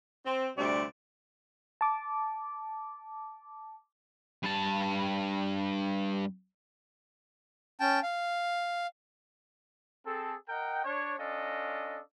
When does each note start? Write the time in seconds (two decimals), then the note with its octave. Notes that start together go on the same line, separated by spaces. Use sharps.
0.25 C4
0.56 D2 C3 G3 C4 D5
1.81 A5 D6
4.43 G2 A5
7.79 C#4 G5 A5
8.03 F5
10.04 C4 G#4 A4
10.48 A#4 D#5 F#5 G5
10.84 D4 C#5
11.17 C#4 D4 F4 A4 D#5